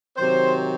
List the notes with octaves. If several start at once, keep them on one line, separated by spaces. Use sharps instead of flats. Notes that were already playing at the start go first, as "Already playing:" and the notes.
C3 D#3 F#3 C5